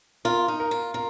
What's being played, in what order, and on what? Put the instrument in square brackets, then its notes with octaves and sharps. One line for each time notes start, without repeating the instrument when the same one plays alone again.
[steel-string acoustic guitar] F4 [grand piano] A#4
[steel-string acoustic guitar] D#4
[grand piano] A#4
[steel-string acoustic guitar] F4
[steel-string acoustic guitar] F4 [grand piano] A#4